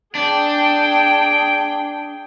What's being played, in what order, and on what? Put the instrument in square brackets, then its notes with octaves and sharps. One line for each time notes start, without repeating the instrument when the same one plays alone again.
[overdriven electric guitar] D4 [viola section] G#4 G5